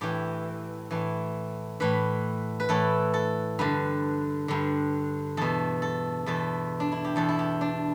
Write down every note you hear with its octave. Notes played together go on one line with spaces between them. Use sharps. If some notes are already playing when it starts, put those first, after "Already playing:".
A2 E3 G4
A2 E3
A2 E3 B4
B4
A2 E3 A4
A4
G2 D3 B4
G2 D3
E2 B2 A4
A4
E2 B2 A4
D4
E4
G4
E2 B2 A4
E4
G4
D4